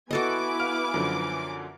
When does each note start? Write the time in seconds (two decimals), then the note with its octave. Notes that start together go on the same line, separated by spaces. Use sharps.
0.11 B3 E4 F#4 A4 B4 D#5 G#5 D6
0.60 F5 F6
0.94 F#2 D3 F3